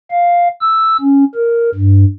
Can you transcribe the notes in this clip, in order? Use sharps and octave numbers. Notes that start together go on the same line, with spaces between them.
F5
E6
C#4
A#4
G2